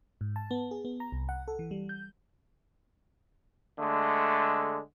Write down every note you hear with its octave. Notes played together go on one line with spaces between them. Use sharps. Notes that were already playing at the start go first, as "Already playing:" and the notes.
G#2
A5
B3
G#4
B3
A#5
C2
F#5
A4
E3
G3
G6
D3 G#3 A3